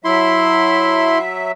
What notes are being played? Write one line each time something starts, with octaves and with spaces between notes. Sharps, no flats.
F#3 E4 E5 C6